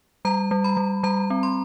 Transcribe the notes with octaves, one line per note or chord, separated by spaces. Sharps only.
G3 A#5
G3
B5
G3
G3 A#5
C4
C6